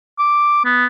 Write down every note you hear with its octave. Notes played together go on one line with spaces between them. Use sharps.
D6
B3